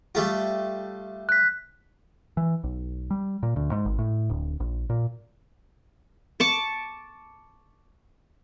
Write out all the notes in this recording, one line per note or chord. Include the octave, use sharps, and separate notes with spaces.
G3 A3 F4
F#6 B6
E3
B1
G3
A#2
D2
G#2
G#1
A2
D1
A#1
A#2
A5 C#6 D6